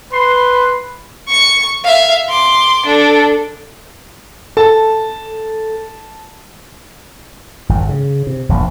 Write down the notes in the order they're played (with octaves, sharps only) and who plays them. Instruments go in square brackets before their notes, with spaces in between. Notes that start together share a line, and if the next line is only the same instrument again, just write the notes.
[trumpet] B4 [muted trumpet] C6
[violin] C#6 C#7
E5 F5
C6 D6
D4 A4
[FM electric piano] A4 [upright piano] A5
[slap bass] G#1 F2
C#3
C3
F1 A#1 D#2